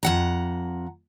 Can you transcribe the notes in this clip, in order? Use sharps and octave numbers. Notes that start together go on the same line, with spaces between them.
F2 F#5 A#5